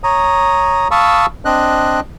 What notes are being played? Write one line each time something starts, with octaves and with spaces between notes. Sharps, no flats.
C#5 A#5 D#6
F5 A5 B5 C#6 D#6 E6
C4 D4 D#5 F#6